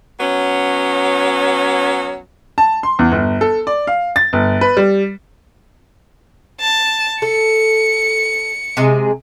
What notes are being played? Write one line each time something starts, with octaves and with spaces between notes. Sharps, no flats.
F#3 B3 C#4
A5
C6
E2
G1
A4
D5
F5
A6
G1
B4
G3
A5
A4 C#7
C3 G#3 G#4